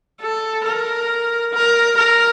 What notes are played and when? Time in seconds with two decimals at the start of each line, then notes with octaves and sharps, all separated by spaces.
0.21 A4
0.65 A#4
1.53 A#4
1.98 A#4